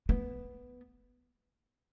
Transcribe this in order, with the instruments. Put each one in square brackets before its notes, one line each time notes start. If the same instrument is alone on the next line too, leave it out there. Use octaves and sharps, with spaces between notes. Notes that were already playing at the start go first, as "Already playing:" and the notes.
[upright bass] B3